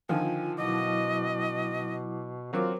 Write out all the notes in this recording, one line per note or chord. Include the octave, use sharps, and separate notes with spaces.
D3 D#3 F3 F4 G#5
B2 F#3 E4 D#5 D6
F#3 C4 F4 A#4 D6